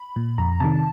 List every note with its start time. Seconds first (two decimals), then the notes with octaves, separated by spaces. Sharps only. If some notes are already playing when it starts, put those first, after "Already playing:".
Already playing: B5
0.16 A#2
0.38 F2 A#5
0.60 C3 D#3 A5